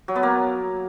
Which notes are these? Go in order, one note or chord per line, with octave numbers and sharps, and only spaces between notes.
F#3
B3
A#3